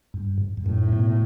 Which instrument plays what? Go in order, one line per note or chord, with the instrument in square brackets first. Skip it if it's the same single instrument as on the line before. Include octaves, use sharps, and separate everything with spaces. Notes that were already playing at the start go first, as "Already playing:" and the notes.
[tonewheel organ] G2
G2
[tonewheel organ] F#2 [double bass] A2
[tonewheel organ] B2